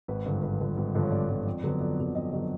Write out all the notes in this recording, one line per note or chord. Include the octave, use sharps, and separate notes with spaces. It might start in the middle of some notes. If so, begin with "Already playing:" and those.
G#1 B4
G2 D3 F3 B4
G#1 B4
G2 D3 F3
G#1
G2 D3 F3
C#5
G#1 D5
G2 D3 F3
F2
D3 F#3 B3
F2 D5
D3 F#3 B3
F2 D#5
D3 F#3 B3 D#5